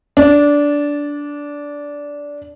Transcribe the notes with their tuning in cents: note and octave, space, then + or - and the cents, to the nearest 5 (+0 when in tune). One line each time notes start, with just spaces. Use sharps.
D4 -15